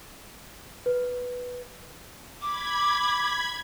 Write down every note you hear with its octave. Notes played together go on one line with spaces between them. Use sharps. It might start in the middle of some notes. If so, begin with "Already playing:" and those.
B4
B5 D6 G#6